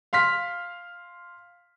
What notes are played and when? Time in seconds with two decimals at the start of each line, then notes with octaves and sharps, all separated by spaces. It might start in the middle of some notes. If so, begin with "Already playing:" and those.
0.13 F5 C6 F6 B6